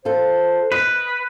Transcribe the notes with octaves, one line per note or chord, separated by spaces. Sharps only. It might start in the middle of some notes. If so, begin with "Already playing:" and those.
F4 A4 C5
B4 D#5